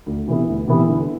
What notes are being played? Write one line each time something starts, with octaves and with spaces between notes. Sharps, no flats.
D2
C3 E3 B3 E4
D2
C3 E3 B3 E4
D3